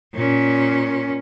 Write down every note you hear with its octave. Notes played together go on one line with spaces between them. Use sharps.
A#2 C#4